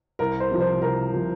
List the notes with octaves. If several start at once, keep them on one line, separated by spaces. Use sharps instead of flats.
C2 A#4
C5
C3 F3
C5
C2 A#4
C3 F3